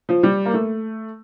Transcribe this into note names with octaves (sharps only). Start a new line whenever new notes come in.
F3
G3
A#3
A3